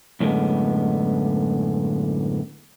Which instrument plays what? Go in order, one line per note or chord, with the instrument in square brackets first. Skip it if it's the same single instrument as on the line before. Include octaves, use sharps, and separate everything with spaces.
[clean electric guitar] F#2 A2 D3 G3 G#3 B3